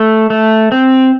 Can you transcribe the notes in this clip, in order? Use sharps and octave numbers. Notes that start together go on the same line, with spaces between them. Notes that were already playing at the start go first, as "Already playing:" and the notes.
Already playing: A3 A4
A3
C4